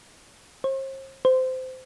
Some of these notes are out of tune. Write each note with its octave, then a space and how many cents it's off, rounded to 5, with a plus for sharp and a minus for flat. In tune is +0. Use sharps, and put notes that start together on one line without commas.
C5 +40
C5 -20